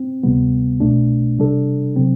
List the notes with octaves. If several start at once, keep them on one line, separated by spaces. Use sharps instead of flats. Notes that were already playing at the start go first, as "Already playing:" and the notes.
Already playing: C4
D2 C3 G3 B3
C2 B2 A3 D4
C3 G3 D4 A4
C3 F#3 C4